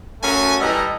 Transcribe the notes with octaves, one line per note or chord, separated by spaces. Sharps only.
F#2 A3 C#4 F#4 G#5
E3 G3 A4 D#5 A#5